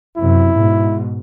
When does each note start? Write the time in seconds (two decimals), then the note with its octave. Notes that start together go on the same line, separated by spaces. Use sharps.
0.17 F#2 C3 E4
0.53 G#2 B2